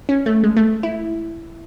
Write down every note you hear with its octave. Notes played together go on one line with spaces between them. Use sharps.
C#4
A3
G#3
A3
E4